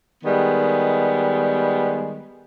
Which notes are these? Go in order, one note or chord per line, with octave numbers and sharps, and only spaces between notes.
D#3 G3 G#3 B3